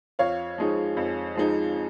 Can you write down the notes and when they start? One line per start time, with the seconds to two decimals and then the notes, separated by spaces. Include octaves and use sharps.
0.19 F2 C#5 F5
0.58 F3 G#3 D#4
0.97 F2
1.35 F3 G#3 D#4